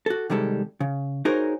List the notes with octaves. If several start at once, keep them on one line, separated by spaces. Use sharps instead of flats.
F#4 A4
C3 D#3 G3 G#3 A4
C#3
D#4 F#4 G#4 A#4 C5 C#5